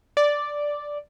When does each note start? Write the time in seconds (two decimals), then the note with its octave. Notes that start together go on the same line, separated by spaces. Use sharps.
0.17 D5